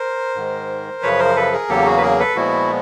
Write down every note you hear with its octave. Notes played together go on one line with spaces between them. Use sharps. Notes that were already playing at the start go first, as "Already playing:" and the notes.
Already playing: A#4 C5
G#2 D#3 G#3
F#2 C#3 F3 B4 C#5
A#4 C5
A4 B4
G#4 A#4
E2 C#3 F#3 A#3 G4 A4
F#4 G#4
B4
G#4 A#4
A4 B4
A#2 F3 G#3 B3 E4 F#4